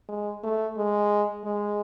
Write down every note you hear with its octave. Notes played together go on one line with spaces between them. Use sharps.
G#3
A3
G#3
G#3